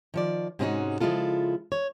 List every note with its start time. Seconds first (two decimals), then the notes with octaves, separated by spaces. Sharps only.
0.14 D#3 F3 D5
0.59 G#2 C3 G#3 C#4 D#4 F#4
1.00 C#3 F3 G#3 E4 F4 A4
1.72 C#5